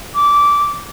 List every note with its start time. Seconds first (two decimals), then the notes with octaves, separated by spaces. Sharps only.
0.15 D6